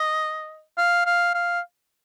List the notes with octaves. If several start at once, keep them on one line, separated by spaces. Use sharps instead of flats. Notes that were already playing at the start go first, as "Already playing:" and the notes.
Already playing: D#5
F5
F5
F5